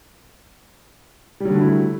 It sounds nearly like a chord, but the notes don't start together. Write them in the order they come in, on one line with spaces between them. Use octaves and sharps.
G3 F#3 D3 A3 E4